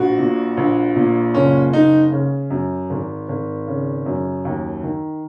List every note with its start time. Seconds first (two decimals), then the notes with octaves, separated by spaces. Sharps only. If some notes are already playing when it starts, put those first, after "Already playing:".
Already playing: A#1 F#4
0.19 A#2
0.57 A#1
0.96 A#2
1.34 F#1 C#4
1.73 F#1 D#4
2.12 C#3
2.50 F#2
2.90 G#1
3.29 G#1
3.67 C#3
4.06 F#2
4.45 D#2
4.83 D#3